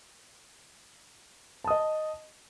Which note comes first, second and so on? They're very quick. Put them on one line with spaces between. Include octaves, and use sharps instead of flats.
A5 D#6 D#5